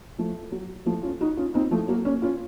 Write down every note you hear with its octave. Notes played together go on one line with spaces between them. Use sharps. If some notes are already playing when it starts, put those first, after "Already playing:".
F3 A3
F#3
F3 A3
C#4 F4
D#4 F#4
C#4 F4
C4 D#4
F3 A3
F#3 A#3
A#3 C#4
C#4 F4